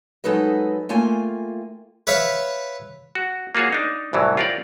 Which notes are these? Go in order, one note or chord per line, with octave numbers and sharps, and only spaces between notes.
F#3 G#3 D#4 A4 B4 D#5
A3 A#3 F4 G5 G#5
B4 C#5 E5 F5 C#6
F#4
A#3 F4 F#4 G#4 C#5
D4 D#4
C2 A2 E3 F#3
F4 G4 A#4 C#5 D5